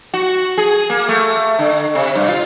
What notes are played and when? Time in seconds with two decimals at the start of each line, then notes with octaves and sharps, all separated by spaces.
0.14 F#4
0.58 G#4
0.90 A#3
1.08 A3
1.59 D3
1.95 C3
2.15 G2
2.28 F4